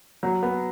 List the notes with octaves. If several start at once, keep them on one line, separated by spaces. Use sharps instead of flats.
F#3
B3